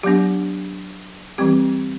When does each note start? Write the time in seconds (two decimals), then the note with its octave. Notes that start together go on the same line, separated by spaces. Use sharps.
0.03 F#3 B3 D4 G4
1.38 E3 G3 C4 G4